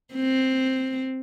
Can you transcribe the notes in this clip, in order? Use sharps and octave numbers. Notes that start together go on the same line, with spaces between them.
C4